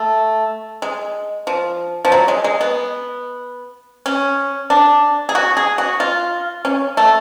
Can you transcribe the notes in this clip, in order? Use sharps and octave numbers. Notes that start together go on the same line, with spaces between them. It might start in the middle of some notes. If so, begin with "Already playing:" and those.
Already playing: A3
G#3
F3
F3
F#3
G#3
G#3
B3
C#4
D4
G#4
F#4
G#4
F#4
F4
C#4
A3